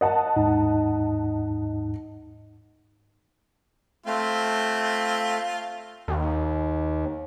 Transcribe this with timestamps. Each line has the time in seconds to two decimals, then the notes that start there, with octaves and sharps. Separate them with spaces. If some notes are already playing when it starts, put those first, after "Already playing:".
0.01 D#5 F#5 A5
0.36 D#2 G#2 D#4
4.06 A3 C4 F4
6.08 D#2